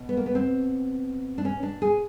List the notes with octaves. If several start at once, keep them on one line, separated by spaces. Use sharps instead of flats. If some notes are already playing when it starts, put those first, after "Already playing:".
Already playing: B2
B3
A#3
B3
C4
D4
C#4
D4
G#4